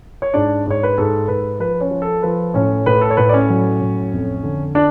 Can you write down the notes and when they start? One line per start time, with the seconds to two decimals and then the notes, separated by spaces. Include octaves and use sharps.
0.22 C#5
0.34 G#2 D4 D5
0.66 G#2 C#5
0.83 B4
0.98 G#2 A4
1.28 G#2 B4
1.60 F3 B4
1.81 C#4 C#5
1.91 F3
2.02 A4
2.23 F3 B4
2.54 A2 C#4 C#5
2.86 A2 B4
3.01 A4
3.10 C#5
3.17 A2 B4
3.29 D5
3.33 C#4 C#5
3.50 F#3
3.81 A2
4.13 F2
4.43 D3
4.75 D4 D5